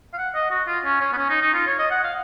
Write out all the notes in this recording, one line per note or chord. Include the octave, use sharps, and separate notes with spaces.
F5
F#5
D#5
F#4
F4
C#4
C#4
B3
C#4
D#4
D#4
F4
C#5
D#5
F#5
F5